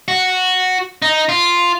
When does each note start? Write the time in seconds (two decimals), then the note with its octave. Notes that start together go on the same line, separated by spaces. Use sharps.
0.08 F#4
1.02 D#4
1.29 F4